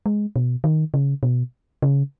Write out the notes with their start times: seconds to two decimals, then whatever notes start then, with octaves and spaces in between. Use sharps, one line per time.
0.06 G#3
0.36 B2
0.64 D#3
0.94 C#3
1.23 B2
1.82 C#3